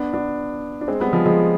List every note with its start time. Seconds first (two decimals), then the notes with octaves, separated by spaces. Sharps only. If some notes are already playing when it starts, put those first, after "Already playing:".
Already playing: B3 D4
0.13 B3 D4
0.81 D4
0.88 G#3 C4
1.00 G3 B3
1.13 F3 G#3
1.26 F3 G#3